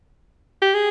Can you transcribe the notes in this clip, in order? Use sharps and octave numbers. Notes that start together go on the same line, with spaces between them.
G4
G#4